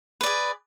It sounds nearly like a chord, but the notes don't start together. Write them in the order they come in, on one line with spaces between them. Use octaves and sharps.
B4 D5 G#4